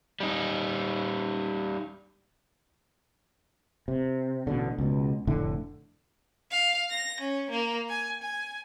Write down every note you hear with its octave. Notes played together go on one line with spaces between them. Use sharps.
G3 D#4
C3
A1 B2 D3
C#2 B2
F1 A2 D3 A3
F5
A#6
C#4
A#3
G#5
G#5